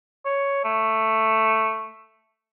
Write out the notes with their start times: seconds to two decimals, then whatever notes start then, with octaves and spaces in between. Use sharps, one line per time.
0.25 C#5
0.64 A3